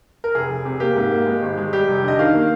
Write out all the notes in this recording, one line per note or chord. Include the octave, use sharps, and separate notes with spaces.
A#4
F1 G#4
F1
C3
A#3 G4
G#2
A#3
G#3
G#1
G#3
G3 G4
F1
D3 D#5
D#3 F5
A#3